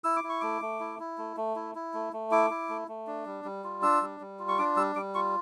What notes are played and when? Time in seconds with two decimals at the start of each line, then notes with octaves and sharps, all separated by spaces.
0.04 E4 E6
0.16 D6
0.24 E4
0.29 C#6
0.41 A3 D6
0.62 A3
0.80 E4
0.99 E4
1.18 A3
1.37 A3
1.56 E4
1.75 E4
1.94 A3
2.13 A3
2.31 E4 D6
2.50 E4
2.69 A3
2.88 A3
3.07 D4
3.26 G3
3.45 G3
3.64 F4
3.82 D4 E6
4.02 G3
4.20 G3
4.39 F4
4.48 C#6
4.58 D4 D6
4.76 G3 E6
4.96 G3 D6
5.15 F4 C#6